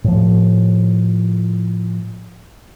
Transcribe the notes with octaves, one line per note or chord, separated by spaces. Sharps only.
A2 F3